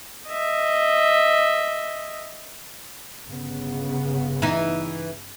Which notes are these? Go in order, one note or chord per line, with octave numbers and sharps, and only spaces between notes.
D#5 E5
G1 C#3 B3
E3 D#4